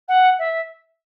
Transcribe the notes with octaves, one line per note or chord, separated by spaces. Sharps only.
F#5
E5